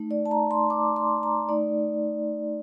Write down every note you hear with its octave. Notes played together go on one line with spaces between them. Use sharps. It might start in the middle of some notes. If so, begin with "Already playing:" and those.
Already playing: A3 D#4
D5
A5
A#5
C6
D6
C6
A#5
A3 D#4 D5